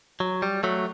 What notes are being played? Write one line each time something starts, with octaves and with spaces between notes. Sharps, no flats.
F#3
G3
F#3 A3